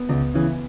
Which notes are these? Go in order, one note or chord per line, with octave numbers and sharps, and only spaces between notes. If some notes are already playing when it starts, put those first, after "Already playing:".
Already playing: B3
C#2
C#3 E3